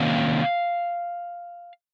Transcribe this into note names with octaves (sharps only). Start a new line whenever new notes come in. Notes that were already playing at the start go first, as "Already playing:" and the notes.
Already playing: C3 D#3 A#3 C#4 F5